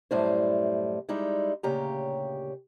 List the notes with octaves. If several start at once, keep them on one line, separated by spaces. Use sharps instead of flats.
F#2 A2 G3 E4 C5
G3 G#3 D#4 E4
D2 A#2 C#3 G4 C#5 A#5